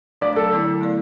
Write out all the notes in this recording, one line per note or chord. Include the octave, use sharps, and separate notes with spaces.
F#3 A3 D4 D5
A4
D3 F#3 B3 E4
A3 E4 D5